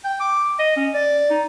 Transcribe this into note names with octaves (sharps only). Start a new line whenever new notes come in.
G5
D6
D#5
C#4
D5
D#4